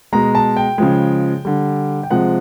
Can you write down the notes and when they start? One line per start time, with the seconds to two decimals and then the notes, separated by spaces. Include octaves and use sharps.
0.13 B2 G#3 A#5
0.35 A5
0.57 G5
0.78 C#3 F3 G#3
1.45 D3 G3
2.03 G5
2.10 C3 F3 G#3 F#5